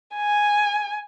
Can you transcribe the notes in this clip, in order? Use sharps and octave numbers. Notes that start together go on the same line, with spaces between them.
G#5